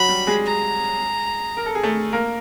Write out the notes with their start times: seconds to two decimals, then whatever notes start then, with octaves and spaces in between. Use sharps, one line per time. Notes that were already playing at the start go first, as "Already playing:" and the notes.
Already playing: F#3 F#4 B5
0.08 G3 G4
0.27 G#3 G#4
0.46 A#5
1.57 A#4
1.66 A4
1.75 G#4
1.83 A3 A4
2.13 A#3 A#4